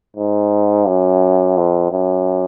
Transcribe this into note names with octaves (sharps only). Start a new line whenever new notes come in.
G#2
F#2
F2
F#2